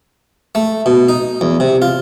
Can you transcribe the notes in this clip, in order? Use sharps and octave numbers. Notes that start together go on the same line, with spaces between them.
A3
B2
D#4
E2
C3
F4